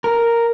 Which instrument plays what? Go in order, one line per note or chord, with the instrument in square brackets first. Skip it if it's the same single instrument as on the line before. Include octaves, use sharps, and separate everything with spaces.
[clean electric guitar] A#4